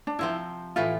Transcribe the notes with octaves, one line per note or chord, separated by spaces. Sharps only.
D4
C3 F3 C4 E4
A2 E3 A3 E4 F4